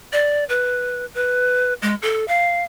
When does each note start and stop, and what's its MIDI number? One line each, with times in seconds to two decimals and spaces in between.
0.13 0.44 74
0.49 1.06 71
1.15 1.74 71
1.82 1.95 56
2.02 2.26 69
2.28 2.64 77